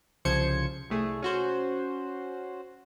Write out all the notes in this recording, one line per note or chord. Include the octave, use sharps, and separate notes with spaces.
C2 C#3 F3 C5 G#6 C#7
C2 A3 G#4
C#4 F#4 C5